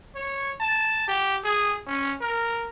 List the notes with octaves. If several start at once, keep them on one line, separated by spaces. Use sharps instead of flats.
C#5
A5
G4
G#4
C#4
A#4